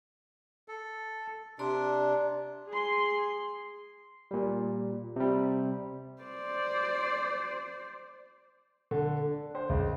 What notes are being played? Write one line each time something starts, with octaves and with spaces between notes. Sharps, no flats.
A4
C3 D4 D5 A#5 C6
G#4 C6
A#2 G3
C3 G3
C5 D5
D3
D4
C5
C#2